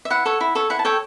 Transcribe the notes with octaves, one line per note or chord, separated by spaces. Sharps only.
E5
E4 F#5
A4 C#5
E4
A4 C#5
E4 F#5
A5
A4 C#5 G5